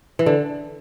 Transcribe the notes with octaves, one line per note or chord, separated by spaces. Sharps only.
E3
D3